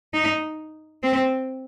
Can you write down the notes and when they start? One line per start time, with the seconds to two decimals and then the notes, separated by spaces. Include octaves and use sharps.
0.14 D#4
1.03 C4